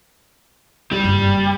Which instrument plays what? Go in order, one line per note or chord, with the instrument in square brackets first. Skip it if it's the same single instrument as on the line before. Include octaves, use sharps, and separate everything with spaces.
[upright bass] G2 B2 [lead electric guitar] G3
[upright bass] F#1 G2